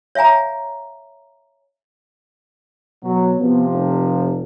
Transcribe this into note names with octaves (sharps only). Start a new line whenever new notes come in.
C#5 E5 F5 G#5 A#5
B2 F#3
C3 F3 B3
F1